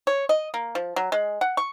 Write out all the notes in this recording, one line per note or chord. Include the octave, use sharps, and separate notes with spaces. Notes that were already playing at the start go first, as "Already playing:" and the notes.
C#5
D#5
A#3
F3
F#3
G#3
F#5
C#6